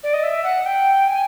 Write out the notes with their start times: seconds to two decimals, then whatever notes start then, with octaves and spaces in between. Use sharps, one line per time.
0.03 D5
0.13 D#5
0.23 E5
0.44 F#5
0.66 G5
1.07 G#5